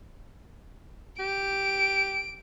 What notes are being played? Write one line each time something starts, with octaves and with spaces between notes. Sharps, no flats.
G4 D7